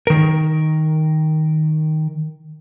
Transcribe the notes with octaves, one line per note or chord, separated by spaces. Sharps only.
D#3 A#4